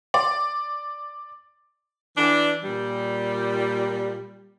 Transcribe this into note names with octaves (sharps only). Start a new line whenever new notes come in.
D5
E3 D4
A#2 G3